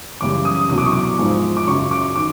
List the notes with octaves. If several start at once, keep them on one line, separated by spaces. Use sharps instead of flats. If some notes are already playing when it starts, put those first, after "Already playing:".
F#2 C#3 E3 G3 D6
D#6
C2 B2 F#3 D#6
D6
C#6
D6
G#2 F3 G#3
D6
F#2 C#3 F#3 C#6
D6
D#3 D6